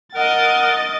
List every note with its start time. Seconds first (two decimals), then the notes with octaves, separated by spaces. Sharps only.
0.14 A#4 D#5 F#5 A6